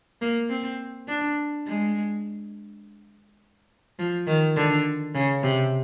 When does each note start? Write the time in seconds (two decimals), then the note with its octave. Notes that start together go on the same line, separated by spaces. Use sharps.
0.21 A#3
0.49 C4
1.08 D4
1.67 G#3
3.99 F3
4.27 D#3
4.56 D3
5.15 C#3
5.43 C3